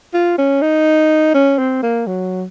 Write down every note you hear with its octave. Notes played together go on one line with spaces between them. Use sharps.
F4
C#4
D#4
C#4
C4
A#3
F#3